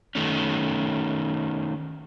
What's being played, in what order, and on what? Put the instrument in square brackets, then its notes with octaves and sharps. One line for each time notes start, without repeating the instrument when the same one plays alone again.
[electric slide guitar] D#3 A3 C#4